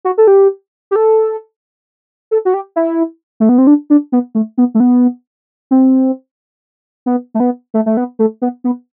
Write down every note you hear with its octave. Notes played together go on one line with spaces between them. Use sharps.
F#4
A4
G4
G4
A4
A4
F#4
G4
E4
A3
B3
C4
D4
D4
B3
A3
B3
A3
B3
C4
B3
A3
B3
A3
A3
B3
A3
B3
B3